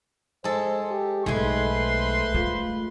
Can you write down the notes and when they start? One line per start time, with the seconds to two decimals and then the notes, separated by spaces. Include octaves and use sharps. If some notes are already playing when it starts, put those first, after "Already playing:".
0.44 G#3 A4 C5
0.91 G4
1.26 B1 G#3 A3 B4 C5 G#5 C6
2.35 A3 F4